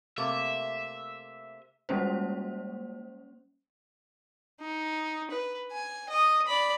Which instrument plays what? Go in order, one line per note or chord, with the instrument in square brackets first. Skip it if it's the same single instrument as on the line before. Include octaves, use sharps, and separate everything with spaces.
[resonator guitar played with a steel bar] C3 A3 A#3 [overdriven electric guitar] E5
[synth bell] G3 G#3 A#3 C#4 C5
[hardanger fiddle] D#4
B4
G#5
D#5 D#6
D5 B5